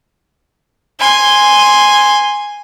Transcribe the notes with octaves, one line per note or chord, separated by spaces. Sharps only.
G#5 C6